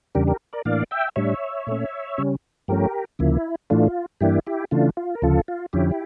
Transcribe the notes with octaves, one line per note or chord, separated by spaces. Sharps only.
E2 C#3 G3 D4 G4 A#4
G4 A#4
A#4 D5
A2 E3 A#3 D4 D5 F5
E5 G5
A2 G3 D4 C#5 E5
A#2 A3 C#4
C#3 G3 C#4
G2 F3 A3 C#4 G4 A#4
D2 C#3 F3 A#3 E4
A2 E3 A3 D4 F4
G2 E3 A#3 D4 E4 G4
E4 G4
C#3 E3 A3 D4 F4
F4
A#4
D2 C#3 F3 F4 A4
F4
F2 D3 F3 C#4 E4 G4